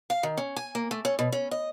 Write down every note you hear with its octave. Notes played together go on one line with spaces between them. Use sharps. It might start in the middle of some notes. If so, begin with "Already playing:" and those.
F5
D#3
C#4
G#5
A#3
A3
C#4
B2
C#4
D#5